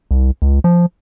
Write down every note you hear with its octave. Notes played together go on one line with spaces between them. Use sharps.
C2
C#2
F3